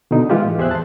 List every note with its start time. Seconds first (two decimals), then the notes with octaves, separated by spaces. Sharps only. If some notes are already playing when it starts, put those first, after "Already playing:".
0.11 B2 D3 D#4
0.30 E3 G#3 F4 G4
0.44 A2
0.58 E2 G4 G#4 C5 E5 F#6
0.71 A5 C6